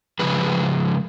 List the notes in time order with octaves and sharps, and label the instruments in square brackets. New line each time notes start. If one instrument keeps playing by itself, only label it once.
[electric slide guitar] C#3 F3 G#3 B4